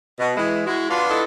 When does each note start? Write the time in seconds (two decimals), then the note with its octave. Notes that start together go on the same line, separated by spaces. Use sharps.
0.19 B2
0.37 E3 G#3 E4
0.67 G#3 E4 F#4
0.90 B3 D4 F4 C6
1.09 E4 A4 D#5